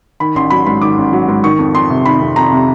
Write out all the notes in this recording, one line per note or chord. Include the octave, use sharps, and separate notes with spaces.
D#3 B5
A1 C6
F#3 B5
G#2 B5
D#3 D6
A1
F#3
G#2
D#3 C#6
F2
F2 C6
C3
D#3 B5
F2
F2 A#5
C3